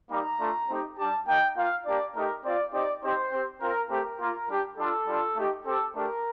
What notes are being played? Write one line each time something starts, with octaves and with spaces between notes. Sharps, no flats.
G3 A#3 D#4 G4 A#5
A3 D4 F4
A3 C4 D#4 G4
G3 D4 G4 A5
A#3 D#4 G4 G5
A#3 F4 F5
A#3 D4 G4 D5
A3 D#4 G4 A#4
C4 F4 D5
C4 D#4 G4 D5
C4 D#4 G4 C5
C4 G4
C4 F4 A#4
A3 C4 G4 A#4
A#3 F4
G3 D4 G4
G3 D4 F4 A4
G3 D4 F4
A3 D#4 G4
C4 G4 A4
A3 D4 G4 A#4